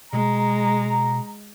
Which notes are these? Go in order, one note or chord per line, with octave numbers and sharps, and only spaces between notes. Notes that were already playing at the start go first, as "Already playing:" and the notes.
B2 G#3 A#5